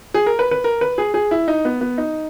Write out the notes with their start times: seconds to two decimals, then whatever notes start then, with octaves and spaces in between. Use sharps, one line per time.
0.14 G#4
0.26 A#4
0.39 B4
0.51 B4
0.64 A#4
0.81 B4
0.98 G#4
1.14 G#4
1.31 E4
1.48 D#4
1.65 B3
1.81 B3
1.98 D#4